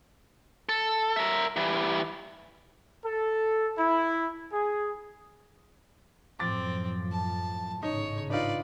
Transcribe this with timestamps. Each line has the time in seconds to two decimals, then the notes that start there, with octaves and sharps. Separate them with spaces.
0.69 A4
1.16 A#4 E5
1.56 E3 G3
3.05 A4
3.78 E4
4.52 G#4
6.39 F#2 A2 F3 C4 D6 A6
7.11 A5
7.83 G#1 A2 C#3 D#4 C#5
8.30 D4 D#4 F4 B4 D5